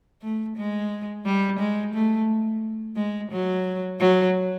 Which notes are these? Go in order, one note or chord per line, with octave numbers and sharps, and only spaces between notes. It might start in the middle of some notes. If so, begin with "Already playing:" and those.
A3
G#3
G3
G#3
A3
G#3
F#3
F#3